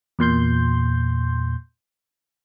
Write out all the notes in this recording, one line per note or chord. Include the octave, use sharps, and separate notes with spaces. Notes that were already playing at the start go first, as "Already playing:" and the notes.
E2 A#2 C6 G6